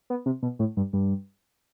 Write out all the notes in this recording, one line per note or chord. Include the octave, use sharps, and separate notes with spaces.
B3
C3
B2
A2
G2
G2